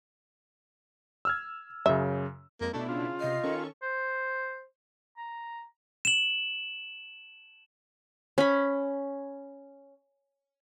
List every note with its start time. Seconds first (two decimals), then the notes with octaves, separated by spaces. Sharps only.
1.25 E6 F6 G#6
1.86 F#2 C#3 E5
2.61 F2 G#3 A#3
2.73 B2 A3 D4 E4
2.89 C#3 F4
3.20 C3 D#5 C7
3.43 D#3 C#4 A4 C#6
3.82 C5
5.17 A#5
6.05 E7 F#7
8.38 C#4 B5